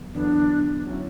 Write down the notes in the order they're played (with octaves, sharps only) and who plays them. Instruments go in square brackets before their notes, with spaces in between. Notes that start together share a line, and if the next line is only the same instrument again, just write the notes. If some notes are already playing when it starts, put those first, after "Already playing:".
Already playing: [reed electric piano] E2 D3 F#3 B3
[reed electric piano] E2 D3 F#3 B3 [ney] D4
[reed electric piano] F#3 C#4 E4